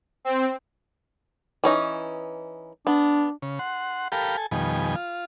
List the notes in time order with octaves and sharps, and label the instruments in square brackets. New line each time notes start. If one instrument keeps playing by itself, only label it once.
[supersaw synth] C4
[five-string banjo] E3 C#4 D#4
[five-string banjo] B3 [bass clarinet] D4
[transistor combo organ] C#3
F#5 C6
G4 A4 A#4 F5 G5 B5
A4 G#5
F2 B2 D#3 G3 G#5
F4